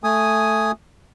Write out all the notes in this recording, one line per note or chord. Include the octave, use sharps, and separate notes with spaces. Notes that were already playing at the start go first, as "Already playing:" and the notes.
A3 G#5 D#6